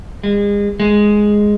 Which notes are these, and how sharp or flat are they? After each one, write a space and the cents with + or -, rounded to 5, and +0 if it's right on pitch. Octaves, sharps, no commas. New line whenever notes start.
G#3 -35
G#3 +0